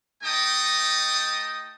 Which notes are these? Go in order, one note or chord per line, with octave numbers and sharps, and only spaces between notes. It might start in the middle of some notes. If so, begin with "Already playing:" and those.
A3 D#4 D#5 G5 A5 D#6